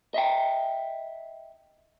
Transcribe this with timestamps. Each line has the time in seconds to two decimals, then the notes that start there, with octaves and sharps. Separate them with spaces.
0.14 D#5 E5 G5